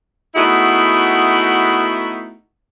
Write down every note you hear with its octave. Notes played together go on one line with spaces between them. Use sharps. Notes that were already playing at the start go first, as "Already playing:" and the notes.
A3 B3 D#4 E4 F#4 G#4